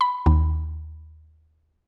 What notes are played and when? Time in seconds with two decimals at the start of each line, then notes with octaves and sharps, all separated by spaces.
0.01 B5
0.26 D#2